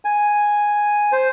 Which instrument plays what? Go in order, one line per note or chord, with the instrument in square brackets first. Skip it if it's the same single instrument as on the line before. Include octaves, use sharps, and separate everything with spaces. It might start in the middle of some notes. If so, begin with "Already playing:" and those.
[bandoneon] G#5
C5